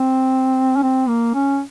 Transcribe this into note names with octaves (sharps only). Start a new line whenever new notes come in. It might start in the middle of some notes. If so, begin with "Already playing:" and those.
Already playing: C4
C#4
C4
A#3
C#4